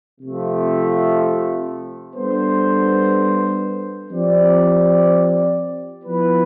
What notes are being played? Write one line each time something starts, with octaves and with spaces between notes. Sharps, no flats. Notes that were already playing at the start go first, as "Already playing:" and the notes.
C3 F3 A3
G3 B3 D4 A4 C5
F3 C4 G4 D5
F3 B3 E4 B4